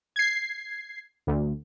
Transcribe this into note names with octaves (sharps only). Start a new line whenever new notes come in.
G#6 C7
D2